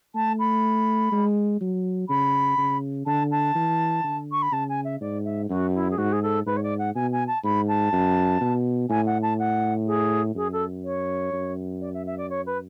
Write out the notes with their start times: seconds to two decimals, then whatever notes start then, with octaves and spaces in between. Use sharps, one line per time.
0.15 A3 A5
0.39 B5
1.12 G#3
1.61 F#3
2.09 C#3 B5
2.58 C#3
3.06 D3 A5
3.31 A5
3.55 E3
4.04 D3
4.31 C#6
4.42 B5
4.52 C#3 A5
4.69 G#5
4.84 E5
5.01 G#2 D5
5.25 E5
5.49 F#2 F#4
5.74 E4
5.90 G#4
5.98 G#2 F#4
6.12 G#4
6.22 A4
6.46 G#2 B4
6.56 C#5
6.63 D5
6.78 F#5
6.95 B2 G#5
7.12 G#5
7.27 A5
7.44 G#2 B5
7.68 A5
7.92 F#2
8.41 B2
8.90 A2 G#5
9.06 F#5
9.22 A5
9.39 F#5
9.87 G#4
10.35 F#2 G#4
10.52 A4
10.84 C#5
11.32 F#2
11.81 D5
11.94 E5
12.06 E5
12.18 D5
12.29 C#5
12.46 B4